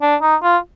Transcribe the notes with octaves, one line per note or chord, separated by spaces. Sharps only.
D4
D#4
F4